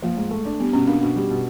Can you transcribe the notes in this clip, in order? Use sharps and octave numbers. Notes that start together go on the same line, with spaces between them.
F3 A#3
G#2
A3
D4
G3 B3
B2 C#4
A#3 D4
B2 D4
G3
B2